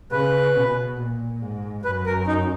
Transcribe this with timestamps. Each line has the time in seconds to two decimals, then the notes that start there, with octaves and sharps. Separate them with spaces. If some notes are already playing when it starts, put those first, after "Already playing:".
0.12 C#3 B4
0.56 B2
0.98 A#2
1.41 G#2
1.84 F#2 B4
2.06 A#4
2.27 D#4